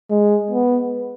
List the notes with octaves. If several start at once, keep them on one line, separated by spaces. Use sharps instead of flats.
G#3
B3